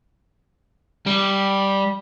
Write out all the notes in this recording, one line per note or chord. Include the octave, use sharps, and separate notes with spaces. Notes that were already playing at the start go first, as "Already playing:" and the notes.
G3